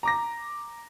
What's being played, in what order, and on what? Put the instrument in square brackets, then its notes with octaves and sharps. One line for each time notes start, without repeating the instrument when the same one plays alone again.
[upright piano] A#5 D6 A#6